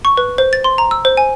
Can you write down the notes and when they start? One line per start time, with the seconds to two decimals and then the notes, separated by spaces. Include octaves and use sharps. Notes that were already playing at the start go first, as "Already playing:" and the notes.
0.05 C#6
0.17 B4
0.38 C5
0.53 A6
0.64 C6
0.78 A#5
0.91 E6
1.05 C5
1.17 G#5